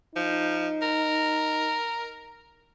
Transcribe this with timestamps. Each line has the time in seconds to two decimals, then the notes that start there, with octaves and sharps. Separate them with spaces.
0.16 F3 D#4
0.82 A#4